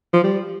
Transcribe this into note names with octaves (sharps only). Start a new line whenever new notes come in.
F3
G3